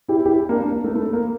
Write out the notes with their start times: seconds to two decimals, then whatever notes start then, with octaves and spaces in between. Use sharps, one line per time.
0.08 E4 G4
0.26 E4 G4
0.49 A#3 D4
0.60 A#3 D4
0.72 A#3
0.84 A3
0.95 A3
1.13 A#3